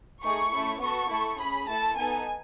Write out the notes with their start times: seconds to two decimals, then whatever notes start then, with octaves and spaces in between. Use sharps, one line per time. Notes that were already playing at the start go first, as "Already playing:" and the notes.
0.21 A3 D#4 G#4 C#6
0.50 A3 C#4 E4
0.79 B3 F#4 A4 C#6
1.08 A3 E4 A4
1.37 C#4 G#4 B5
1.67 A3 E4 A4 A5
1.96 B3 D#4 A4 G#5